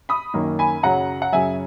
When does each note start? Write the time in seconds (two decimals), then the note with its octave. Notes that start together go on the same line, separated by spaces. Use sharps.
0.09 B5 D#6
0.34 F#2 D#3 A#3 C#4
0.59 G#5 B5
0.83 F#2 C#3 F#3 F#5 A#5
1.22 F#5
1.32 F#2 C#3 F#3 E5 G#5